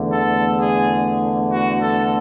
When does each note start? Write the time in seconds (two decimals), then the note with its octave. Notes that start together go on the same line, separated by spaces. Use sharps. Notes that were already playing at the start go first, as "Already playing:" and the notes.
Already playing: E2 D3 A3
0.12 A4
0.59 G#4
1.50 F#4
1.81 A4